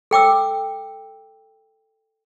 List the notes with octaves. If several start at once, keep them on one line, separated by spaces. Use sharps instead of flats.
A4 G5 D6 E6